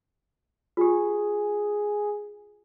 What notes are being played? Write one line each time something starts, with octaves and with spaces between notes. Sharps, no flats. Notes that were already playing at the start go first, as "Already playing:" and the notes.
F4 G4 G#4